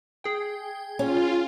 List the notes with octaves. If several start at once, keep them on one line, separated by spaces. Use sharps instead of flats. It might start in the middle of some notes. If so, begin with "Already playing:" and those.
G#4 G5
C#4 F4